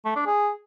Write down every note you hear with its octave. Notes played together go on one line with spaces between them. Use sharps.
A3
D4
G#4